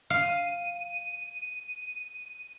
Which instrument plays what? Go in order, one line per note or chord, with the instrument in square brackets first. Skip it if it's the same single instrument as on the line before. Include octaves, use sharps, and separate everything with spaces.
[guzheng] F5 [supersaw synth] D#7